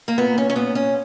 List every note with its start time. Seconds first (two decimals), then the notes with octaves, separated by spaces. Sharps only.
0.08 A#3
0.18 A#2 B3
0.38 C#4
0.50 C#4
0.55 A#2 B3
0.75 C#4